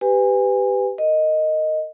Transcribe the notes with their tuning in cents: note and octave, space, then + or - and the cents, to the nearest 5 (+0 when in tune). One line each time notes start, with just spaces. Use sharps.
G4 +0 B4 +20 G#5 -25
A#4 -30 D#5 +0